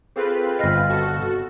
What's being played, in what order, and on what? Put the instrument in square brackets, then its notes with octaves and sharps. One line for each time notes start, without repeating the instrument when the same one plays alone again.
[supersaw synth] C4 F4 B4 [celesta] G#4 A4
[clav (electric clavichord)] G1 F5 [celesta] D#5 F6 A#6
[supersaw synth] F#4 A4